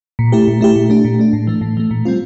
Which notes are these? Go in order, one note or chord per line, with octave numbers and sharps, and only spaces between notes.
A#2
A3 E4 G4
A#2
A3 E4 G4
A#2
A3 D4
A#2
A3 D4
A2
E3 A3
A2
E3 A3
A#2
G3 C4 F4